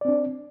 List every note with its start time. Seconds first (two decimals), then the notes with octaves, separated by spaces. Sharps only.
0.01 D5
0.05 C4
0.08 D4